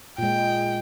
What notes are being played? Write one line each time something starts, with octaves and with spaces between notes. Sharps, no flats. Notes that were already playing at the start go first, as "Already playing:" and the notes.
A#2 G#3 G5